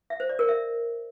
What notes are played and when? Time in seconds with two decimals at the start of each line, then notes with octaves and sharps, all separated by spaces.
0.10 E5
0.20 C5
0.29 D5
0.39 A#4
0.49 E5